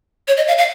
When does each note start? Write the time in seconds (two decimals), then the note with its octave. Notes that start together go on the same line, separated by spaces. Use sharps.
0.28 C#5
0.37 D#5
0.48 F5
0.58 F5